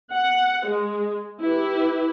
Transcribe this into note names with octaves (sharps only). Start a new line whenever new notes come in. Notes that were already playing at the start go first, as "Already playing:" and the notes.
F#5
G#3
E4 G4 B4